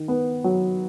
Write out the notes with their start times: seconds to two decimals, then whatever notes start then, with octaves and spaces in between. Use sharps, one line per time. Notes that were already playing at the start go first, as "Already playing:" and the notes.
Already playing: D#3
0.08 B3
0.44 F#3